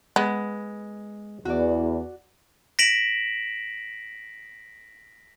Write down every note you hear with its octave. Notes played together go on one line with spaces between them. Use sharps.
G#3 B3
E2 F#4 D5
A#6 B6 D7 E7 F#7